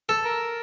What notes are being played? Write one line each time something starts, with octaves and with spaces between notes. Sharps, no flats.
A4
A#4